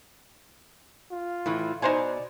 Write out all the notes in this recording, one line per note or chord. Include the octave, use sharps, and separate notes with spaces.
F4
A2 E3
B2 D#4 C5 D5 G#5